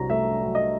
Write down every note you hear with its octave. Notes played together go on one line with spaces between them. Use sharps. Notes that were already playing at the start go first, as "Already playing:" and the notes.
Already playing: C2 F#3 A#5
A3 E5
F#3
D#5